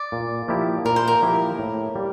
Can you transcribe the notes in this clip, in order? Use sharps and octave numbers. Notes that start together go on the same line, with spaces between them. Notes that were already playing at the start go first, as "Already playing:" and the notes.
Already playing: D5
A#2
F3 A#3 E4 G4
A#2 A#4
C5
A#4
F3 A#3 E4 G4
A2
G3 A#3